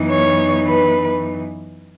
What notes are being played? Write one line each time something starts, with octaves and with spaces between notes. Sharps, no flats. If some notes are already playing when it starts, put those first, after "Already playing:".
Already playing: F#2 E3 B3 D#4
C#5
B4